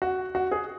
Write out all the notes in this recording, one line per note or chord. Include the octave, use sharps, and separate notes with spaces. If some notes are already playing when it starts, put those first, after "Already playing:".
F#4
F#4
G#4